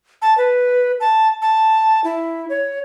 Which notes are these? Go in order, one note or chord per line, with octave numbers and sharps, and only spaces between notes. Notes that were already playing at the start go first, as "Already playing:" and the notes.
A5
B4
A5
A5
E4
C#5